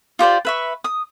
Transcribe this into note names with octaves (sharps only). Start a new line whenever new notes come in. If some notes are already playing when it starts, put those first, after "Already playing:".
F4 G4 C5 D5
B4 E5 C#6
D#6